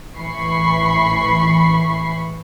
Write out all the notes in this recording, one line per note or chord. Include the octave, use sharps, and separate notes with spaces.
A1 E3 B5 C#6 C7